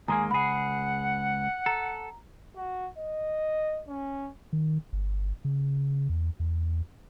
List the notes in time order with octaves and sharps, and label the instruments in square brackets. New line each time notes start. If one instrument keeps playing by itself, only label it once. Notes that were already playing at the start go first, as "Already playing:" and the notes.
[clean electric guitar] D#2 G#3 A#3 [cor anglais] G#4 [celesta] G#5 A#5
[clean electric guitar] C#2 G#4 [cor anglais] F#5 [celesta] B5 C7
[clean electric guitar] A4 [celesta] A#5
[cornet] F#4
D#5
C#4
[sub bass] D#3
G1
C#3
E2
E2